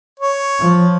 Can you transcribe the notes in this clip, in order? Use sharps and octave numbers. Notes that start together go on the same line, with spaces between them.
C#5
F3